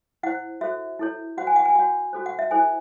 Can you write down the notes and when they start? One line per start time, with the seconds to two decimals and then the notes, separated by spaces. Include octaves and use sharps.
0.23 E4 C5 F#5
0.61 F#4 A4 C5 E5
0.99 E4 A4 C#5
1.37 F#4 C5 F#5
1.47 G#5
1.56 F#5
1.65 G#5
1.75 F#4 C#5 F#5
2.13 F#4 A4 C5
2.26 F#5
2.39 E5
2.51 E4 A4 C5 G#5